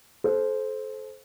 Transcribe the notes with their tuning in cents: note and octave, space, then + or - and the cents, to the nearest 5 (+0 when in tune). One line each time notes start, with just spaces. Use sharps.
A4 -30 C5 +0